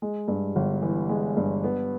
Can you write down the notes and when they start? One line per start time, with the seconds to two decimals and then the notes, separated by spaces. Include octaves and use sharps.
0.02 G#3
0.28 G2
0.56 G1
0.82 E3
1.09 G#3
1.37 G2
1.64 B3